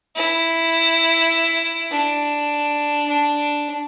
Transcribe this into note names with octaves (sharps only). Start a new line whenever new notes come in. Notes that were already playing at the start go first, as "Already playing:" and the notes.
E4
D4
D4